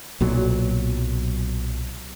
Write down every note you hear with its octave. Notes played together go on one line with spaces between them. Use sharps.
B1 A#2 F#3